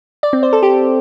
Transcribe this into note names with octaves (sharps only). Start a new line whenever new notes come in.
D5
C4
C5
A4
G4